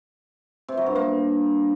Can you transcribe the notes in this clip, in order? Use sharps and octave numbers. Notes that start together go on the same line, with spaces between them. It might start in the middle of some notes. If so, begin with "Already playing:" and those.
C3
F#3
G2
A#3